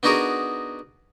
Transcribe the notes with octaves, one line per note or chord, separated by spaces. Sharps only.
B3 D4 D#4 F#4 G#4 A#4